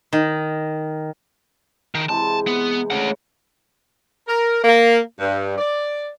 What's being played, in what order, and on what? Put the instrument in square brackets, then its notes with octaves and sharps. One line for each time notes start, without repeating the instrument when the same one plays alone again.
[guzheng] D#3
[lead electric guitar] D#3 [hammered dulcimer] A5
[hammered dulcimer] C3 E3 G#3 [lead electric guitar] A5
[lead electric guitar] B3
[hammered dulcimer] C#3 [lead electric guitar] A3 F#5
[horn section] A#4
A#3
G2
D5